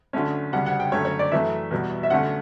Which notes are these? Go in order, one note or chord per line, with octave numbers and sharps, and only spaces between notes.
D2 D3 A3 C#4
D2 C#3 G3 D4 F#5
F#5
G5
F#2 D3 A3 C#4 C#5
C#5
D5
F#2 E3 A3 E5
E2 B2 G3
E5
D2 D3 A3 C#4 F#5